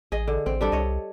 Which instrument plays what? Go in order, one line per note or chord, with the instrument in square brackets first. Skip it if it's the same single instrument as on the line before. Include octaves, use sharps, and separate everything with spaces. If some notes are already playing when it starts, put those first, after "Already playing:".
[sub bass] A1 [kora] G#4 D#5
[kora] D3
[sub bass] A1 [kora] C4
[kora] G3 D4 A4
[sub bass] C2 [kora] C#5 D#5